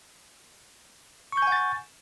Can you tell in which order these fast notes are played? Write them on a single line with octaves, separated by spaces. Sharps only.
C#6 G6 G#5 F#5 A6